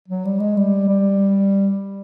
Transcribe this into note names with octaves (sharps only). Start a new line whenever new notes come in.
F#3
G3
G#3
G3
G3